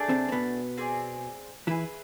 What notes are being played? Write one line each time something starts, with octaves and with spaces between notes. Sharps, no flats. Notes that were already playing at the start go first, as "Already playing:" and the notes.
Already playing: A3 D4 G#4 D5
C3 C4
C4
B2 B3
C4 G#4 D5
E3 E4 G#4 B4 E5